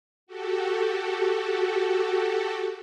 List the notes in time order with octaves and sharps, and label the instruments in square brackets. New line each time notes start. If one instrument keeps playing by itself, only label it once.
[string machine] F#4 G4 A4